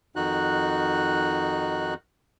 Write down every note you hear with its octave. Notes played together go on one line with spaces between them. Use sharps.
F2 D#3 D#4 F#4 F#6